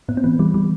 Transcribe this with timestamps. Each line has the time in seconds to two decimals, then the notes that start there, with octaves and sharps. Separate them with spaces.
0.08 A2 B3
0.17 C4
0.24 E3 B3
0.39 E3 G3
0.54 E3 G3